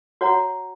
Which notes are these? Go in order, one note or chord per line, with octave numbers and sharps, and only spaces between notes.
F#4 C#5 F#5 A#5